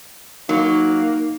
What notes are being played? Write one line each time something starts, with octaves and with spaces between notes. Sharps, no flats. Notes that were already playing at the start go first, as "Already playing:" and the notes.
F#3 A#3 D#4